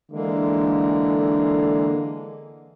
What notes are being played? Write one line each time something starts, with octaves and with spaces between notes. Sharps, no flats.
D3 E3 G#3 A#3